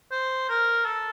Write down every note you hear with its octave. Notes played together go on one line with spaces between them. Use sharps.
C5
A#4
A4